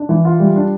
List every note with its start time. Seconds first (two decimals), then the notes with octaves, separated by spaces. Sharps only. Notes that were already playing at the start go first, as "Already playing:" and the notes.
Already playing: D4
0.09 E3
0.25 F4
0.40 G3
0.56 D4